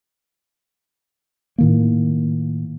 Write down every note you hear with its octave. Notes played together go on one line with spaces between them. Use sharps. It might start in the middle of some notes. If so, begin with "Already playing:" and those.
A2 D#3 A#3